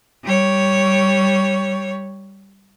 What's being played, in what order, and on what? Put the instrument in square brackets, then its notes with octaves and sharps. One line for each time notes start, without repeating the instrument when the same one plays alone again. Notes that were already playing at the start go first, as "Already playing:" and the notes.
[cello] G3 C#5